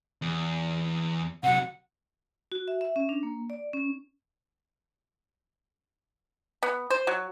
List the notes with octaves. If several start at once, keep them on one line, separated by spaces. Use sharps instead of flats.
E2
C3 F#3 F#5
F#4
E5
E5
C#4
D4
A#3
D5
C#4
B3
C5
F#3